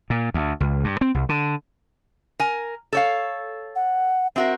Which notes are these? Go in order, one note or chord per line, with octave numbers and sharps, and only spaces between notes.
A#2
D2
C#2
G2
C4
C2
D3
A#4 G#5
A4 C#5 F5
F#5
C4 F#4 A#4 E5